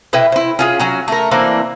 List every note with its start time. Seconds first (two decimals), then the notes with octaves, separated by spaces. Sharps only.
0.13 B2 E4 B4 G5
0.32 E4 C5
0.59 C#4 F4 G#4
0.79 F#3 C#4 F#4
1.08 A3 A#4
1.31 E3 A#3 C4 D4